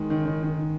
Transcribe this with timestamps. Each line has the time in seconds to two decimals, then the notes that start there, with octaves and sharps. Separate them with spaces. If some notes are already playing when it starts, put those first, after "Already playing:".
Already playing: D#3 G#3
0.10 D#3
0.25 D#3
0.43 D#3